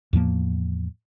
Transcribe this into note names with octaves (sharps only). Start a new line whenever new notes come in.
E2 A2 F3 A#3